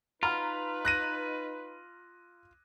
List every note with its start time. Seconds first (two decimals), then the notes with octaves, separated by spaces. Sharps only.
0.23 D#4 F4 B4 A#5 B5 F6
0.85 F#6 A#6 D#7